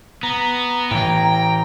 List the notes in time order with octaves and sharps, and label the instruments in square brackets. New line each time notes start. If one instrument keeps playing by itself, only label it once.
[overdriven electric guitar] B3 [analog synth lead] A#5
[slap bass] A2 E3 [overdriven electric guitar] G5